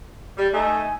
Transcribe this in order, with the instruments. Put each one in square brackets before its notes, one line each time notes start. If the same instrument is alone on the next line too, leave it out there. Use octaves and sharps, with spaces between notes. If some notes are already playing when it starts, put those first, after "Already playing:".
[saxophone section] G3
[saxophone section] A3 D#4 [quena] G#5